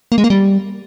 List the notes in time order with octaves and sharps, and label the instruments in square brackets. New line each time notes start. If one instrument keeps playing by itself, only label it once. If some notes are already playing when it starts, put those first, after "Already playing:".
[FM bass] A#3
G#3
A#3
G3